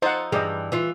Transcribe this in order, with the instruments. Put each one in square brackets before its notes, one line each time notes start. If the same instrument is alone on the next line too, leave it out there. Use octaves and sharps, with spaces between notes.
[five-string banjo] F3 D#4 A4 [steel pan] C5 F#5
[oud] G2 E3 G3 [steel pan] G#4 D#5
[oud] E3 F4